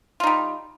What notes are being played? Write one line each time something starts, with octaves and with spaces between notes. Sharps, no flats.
G3 D#4 F4